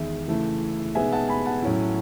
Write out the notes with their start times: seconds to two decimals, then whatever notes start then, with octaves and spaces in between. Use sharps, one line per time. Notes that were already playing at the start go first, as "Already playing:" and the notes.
Already playing: E2 D#3 G#3 D#4 E5
0.28 C#3 E3 A3 E4
0.95 B2 G#3 B3 D#4 E5 G#5
1.12 F#5 A5
1.28 G#5 B5
1.46 F#5 A5
1.62 A2 F#3 C#4 E4